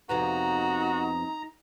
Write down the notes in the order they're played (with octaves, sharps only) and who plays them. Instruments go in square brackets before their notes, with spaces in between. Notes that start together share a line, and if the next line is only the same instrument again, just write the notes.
[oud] F2 C3 B3 [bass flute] D#4 [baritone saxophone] F#4 [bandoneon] A#5